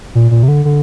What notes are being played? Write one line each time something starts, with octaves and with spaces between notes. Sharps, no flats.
A#2
A#2
C3
D3
D3